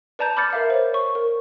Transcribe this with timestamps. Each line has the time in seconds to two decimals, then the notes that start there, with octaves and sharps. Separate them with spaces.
0.19 B4 D5 A5 A#5 G6
0.37 B5 D6 F6 G6 A6 C#7
0.53 A#4 E5 F5
0.70 C5 C#5
0.94 C#6
1.15 A#4